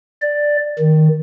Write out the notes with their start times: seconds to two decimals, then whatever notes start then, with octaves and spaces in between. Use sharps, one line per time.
0.22 D5
0.79 D#3